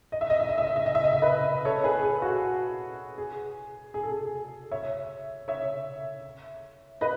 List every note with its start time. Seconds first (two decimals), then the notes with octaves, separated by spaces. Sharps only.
0.12 D#5
0.21 E5
0.30 D#5
0.40 E5
0.49 D#5
0.58 E5
0.67 D#5
0.76 E5
0.86 D#5
0.95 E5
1.03 D#5
1.13 E5
1.22 B4 D#5
1.65 A4 C#5
1.84 G#4 B4
2.03 G#4
2.22 F#4
3.18 G#4
3.94 G#4
4.03 A4
4.12 G#4
4.71 C#5 E5
5.48 C#5 E5
7.01 B4 D#5